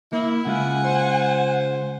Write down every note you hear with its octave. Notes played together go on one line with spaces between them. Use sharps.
A#3 E4
C#3 G#3 F4 F#5 G#5
C5